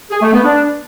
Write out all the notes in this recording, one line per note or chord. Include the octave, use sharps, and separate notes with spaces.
G#4
A3
B3
D4